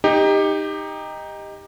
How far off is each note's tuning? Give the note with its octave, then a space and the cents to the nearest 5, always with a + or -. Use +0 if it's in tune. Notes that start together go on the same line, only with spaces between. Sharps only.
D#4 +0 G4 +20